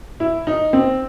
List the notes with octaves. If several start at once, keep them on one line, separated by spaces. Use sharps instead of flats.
E4
D#4
C4